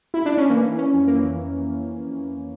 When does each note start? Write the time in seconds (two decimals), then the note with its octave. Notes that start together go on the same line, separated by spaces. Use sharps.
0.14 E4
0.26 D4
0.38 C#4
0.50 E3 A#3
0.72 E3
0.78 C#4
0.93 F2
1.07 A#3
1.15 E3